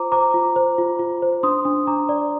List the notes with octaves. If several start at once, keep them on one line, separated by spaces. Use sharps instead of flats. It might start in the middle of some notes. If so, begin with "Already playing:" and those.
Already playing: F4 C5 A#5 D6
C5 A#5 D6
F4
C5
F4
F4
C5
D4 C6 D#6
D4
D4 A#5 D6
D5